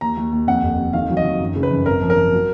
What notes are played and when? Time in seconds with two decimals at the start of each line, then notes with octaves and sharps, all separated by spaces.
0.01 D#2 A#5
0.17 D#2
0.32 D#2
0.47 F2 F#5
0.63 F1
0.78 F2
0.93 D#3 F5
1.10 F#3
1.17 D#5
1.24 D#3
1.40 F#2
1.56 C#3
1.63 B4
1.71 F#2
1.86 G#1 A#4
2.01 F3
2.10 A#4
2.17 F3
2.33 F#3